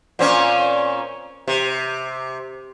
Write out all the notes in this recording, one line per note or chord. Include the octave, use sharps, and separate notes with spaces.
A#2 C4 C#4
C3